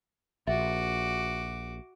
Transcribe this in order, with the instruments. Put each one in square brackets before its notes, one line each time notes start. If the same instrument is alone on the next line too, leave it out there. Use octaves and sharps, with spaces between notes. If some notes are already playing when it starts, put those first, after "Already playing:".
[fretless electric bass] A#1 [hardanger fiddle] F#4 D6 [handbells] E5